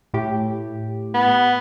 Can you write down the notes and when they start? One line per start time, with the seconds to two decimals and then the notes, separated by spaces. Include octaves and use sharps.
0.14 A2 G4
1.14 B3